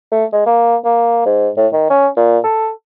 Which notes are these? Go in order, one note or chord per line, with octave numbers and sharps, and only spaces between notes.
A3
G#3
A#3
A#3
G#2
A2
D#3
C#4
A#2
A4